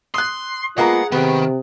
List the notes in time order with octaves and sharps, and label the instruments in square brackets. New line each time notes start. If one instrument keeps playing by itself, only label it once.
[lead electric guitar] C6 [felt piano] D#6 F#6
[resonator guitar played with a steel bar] G#3 A#3 B3 [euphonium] F4 [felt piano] G#4 A#5 [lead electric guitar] F#5
[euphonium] C3 [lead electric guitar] D#3 [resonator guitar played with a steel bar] B3